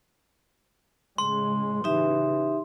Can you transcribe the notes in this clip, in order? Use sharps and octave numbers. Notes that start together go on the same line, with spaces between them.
A2 C#3 G#3 C6
C#3 E3 D#4 G4 E5